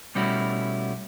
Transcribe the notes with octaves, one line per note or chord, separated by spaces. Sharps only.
B2 G3 A3 C#4 E4 F#4